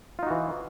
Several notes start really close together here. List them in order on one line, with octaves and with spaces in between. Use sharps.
F4 D#4 F#4 E3